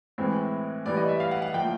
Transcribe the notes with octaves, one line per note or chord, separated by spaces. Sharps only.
A2 E3 G#3 C4
A2 E3 G3 D5
D#5
E5
F5
F#5
F#5
A2 F3 A#3 G5